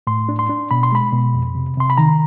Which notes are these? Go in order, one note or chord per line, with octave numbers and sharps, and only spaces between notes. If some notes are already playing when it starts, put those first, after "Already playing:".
A2 C6
D4
C6
D4
B2 B5
C6
G#3 B5
B2
F2
C3
C3 C6
B5
D#3 A#5